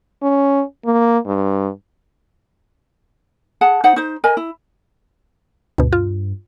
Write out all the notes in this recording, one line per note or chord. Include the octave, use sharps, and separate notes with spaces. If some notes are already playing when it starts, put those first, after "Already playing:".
C#4
A#3
G2
G#4 F#5 A5
D#4 C5 F#5
D#4 C5
A#4 D#5 G#5
E4
D2 G2 B2
F4